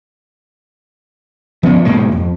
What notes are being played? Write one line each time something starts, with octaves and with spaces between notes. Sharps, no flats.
F3 B3 C#4
G#2 B2 G#3 A#3
F2